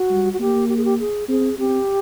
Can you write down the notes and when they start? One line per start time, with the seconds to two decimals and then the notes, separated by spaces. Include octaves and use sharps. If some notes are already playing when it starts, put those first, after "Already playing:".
Already playing: F#4
0.10 G3
0.33 F#4
0.40 A#3 G4
0.69 G4
0.77 G#4
0.85 G4
0.99 G#4
1.29 C4 G#4
1.58 C4 G4